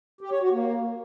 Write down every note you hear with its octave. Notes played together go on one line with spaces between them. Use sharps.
G4
C#5
F#4
A#3